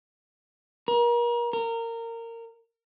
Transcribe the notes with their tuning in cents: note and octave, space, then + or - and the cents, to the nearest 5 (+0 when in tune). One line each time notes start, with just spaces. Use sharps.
A#4 +35
A#4 -20